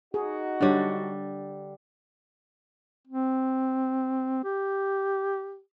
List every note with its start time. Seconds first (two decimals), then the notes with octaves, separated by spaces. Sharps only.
0.14 D#4 F#4 G#4
0.61 D3 G3 D4 C#5
3.07 C4
4.44 G4